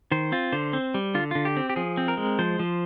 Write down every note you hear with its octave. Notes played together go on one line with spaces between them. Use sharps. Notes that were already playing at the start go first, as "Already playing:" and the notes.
D#3 C5
C4 F4
D3 C5
C4
G3
D3 F4
D3 F4
G4
C4
G4
F3 G#4
C4
A#4
G#3
F3 C5
F3